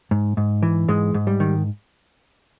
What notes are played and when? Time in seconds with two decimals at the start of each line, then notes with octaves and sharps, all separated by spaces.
0.11 G#2
0.37 G#2
0.63 E3
0.88 G#2 G#3
1.14 G#2
1.27 G3
1.40 D#3